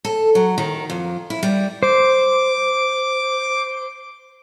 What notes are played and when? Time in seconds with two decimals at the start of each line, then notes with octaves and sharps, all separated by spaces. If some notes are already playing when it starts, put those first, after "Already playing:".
0.05 A4
0.35 F#3
0.58 D#3
0.90 F2
1.30 E4
1.43 G3
1.83 C5 D6